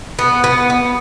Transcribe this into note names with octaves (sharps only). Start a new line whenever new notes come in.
B3
B3
B3